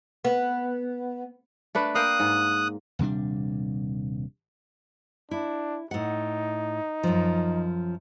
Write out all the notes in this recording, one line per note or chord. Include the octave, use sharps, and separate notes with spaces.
B3
A3 D4 B4
A#3 F5 G5 D#6 F#6
G#2
D#1 C3 G3 D4
D4 E4
A2 D#4 F#5
F#2 F3